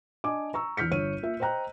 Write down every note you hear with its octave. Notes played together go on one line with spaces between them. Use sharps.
D4 D#5 G#5 D6
A#5 C#6 E6
E2 F6 G6 B6 C#7
G1 C#5 F6 D#7
A#3 F4 E5
C5 D#5 G5 A#5 F#6